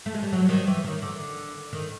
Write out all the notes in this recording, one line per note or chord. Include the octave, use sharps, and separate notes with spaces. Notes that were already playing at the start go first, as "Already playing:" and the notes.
A3
G#3
G3
F#3
D#3
E3
D#3
D3
D#3